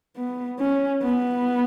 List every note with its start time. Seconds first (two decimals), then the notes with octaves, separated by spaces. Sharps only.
0.17 B3
0.59 C#4
1.02 B3